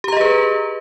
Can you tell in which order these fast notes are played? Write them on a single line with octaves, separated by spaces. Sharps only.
G4 A#5 D#5 G#4 B4